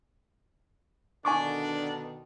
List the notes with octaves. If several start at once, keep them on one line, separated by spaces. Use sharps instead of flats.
B2 D3 D#3 D4 G#5 C#6 D6